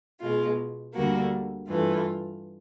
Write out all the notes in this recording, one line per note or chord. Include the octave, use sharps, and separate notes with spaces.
B2 G#3 F4
D2 D3 G3 A#3 F#4
G2 E3 A3 F4